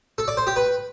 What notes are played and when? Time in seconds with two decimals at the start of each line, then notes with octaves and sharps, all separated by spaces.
0.18 A4
0.28 D5
0.37 C5
0.47 G4
0.56 B4